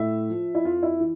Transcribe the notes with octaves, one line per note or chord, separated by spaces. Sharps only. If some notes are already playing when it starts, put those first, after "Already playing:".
Already playing: A2 E5
F3
E4
F2 F4
E4
E3